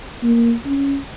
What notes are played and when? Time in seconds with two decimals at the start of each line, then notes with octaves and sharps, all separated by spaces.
0.23 A#3
0.66 C#4